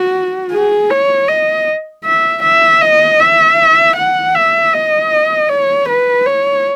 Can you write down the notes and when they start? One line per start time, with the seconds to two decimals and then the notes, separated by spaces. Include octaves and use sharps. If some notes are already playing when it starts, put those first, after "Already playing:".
Already playing: F#4
0.52 G#4
0.91 C#5
1.28 D#5
2.05 E5
2.43 E5
2.81 D#5
3.19 E5
3.96 F#5
4.35 E5
4.73 D#5
5.49 C#5
5.89 B4
6.26 C#5